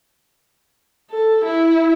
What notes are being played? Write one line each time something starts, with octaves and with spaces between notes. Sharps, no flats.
A4
E4